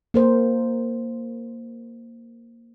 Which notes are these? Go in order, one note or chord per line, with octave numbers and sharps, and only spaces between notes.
A#3 A#4 C5